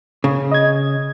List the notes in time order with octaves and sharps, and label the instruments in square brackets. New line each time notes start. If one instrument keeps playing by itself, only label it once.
[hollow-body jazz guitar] C#3
[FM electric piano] D#5 G#6